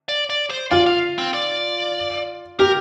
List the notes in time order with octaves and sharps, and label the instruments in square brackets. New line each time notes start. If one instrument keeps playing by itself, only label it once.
[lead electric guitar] D5
D5
C5
[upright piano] F4 [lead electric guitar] D5
[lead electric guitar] F5
C4
D5
[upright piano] G4 [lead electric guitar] A#4